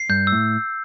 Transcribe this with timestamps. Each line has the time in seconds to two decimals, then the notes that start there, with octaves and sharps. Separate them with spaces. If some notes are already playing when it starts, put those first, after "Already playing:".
Already playing: C7
0.09 G2 G6
0.27 E6
0.32 A2